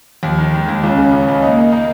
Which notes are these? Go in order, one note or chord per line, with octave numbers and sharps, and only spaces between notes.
D#2 F3
D#3
D#3 G#3
D#2
C#2 C#4
C#3
C#2
C#2
A#3 D#4
D#4
D#4